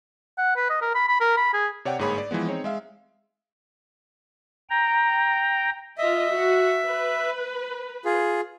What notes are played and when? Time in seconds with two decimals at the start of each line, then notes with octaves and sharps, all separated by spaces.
0.38 F#5
0.56 B4
0.70 D#5
0.82 A#4
0.95 B5
1.09 B5
1.21 A#4
1.37 B5
1.54 G#4
1.85 C3 C#5 D5 F#5 G5
1.99 G1 G#2 A#3 G#4 C#5 B5
2.18 D5
2.31 E3 F3 G#3 B3
2.49 C4 D#4 G#4 C#5
2.64 G#3 E5 F5
4.70 G5 A#5
5.98 F4 D#5 E5
6.31 F#4
6.86 B4
8.05 F4 G#4